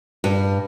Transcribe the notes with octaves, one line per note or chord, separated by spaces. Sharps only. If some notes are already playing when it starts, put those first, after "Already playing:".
G2